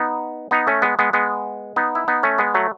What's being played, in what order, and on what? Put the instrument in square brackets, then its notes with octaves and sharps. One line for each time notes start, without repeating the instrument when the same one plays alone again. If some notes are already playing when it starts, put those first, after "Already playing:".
Already playing: [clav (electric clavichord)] B3 D#4
B3 D#4
A3 C#4
G#3 B3
G#3 B3
G#3 B3
B3 D#4
E4
B3 D#4
A3 C#4
G#3 B3
F#3 A3